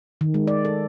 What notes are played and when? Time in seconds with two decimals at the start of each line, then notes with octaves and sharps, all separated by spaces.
0.21 D#3
0.34 G#3
0.47 D5
0.65 A4